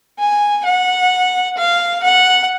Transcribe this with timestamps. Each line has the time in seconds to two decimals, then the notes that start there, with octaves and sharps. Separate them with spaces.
0.19 G#5
0.65 F#5
1.57 F5
2.03 F#5